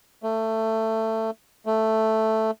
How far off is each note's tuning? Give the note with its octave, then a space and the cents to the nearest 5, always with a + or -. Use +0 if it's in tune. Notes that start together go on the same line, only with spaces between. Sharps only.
A3 +15
A3 +0